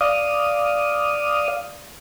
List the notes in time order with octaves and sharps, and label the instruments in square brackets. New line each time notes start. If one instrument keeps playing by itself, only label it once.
[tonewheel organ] D5 F5 D#6